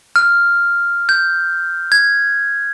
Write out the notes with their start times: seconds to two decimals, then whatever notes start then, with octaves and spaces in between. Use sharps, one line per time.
0.16 F6
1.09 G6
1.92 G#6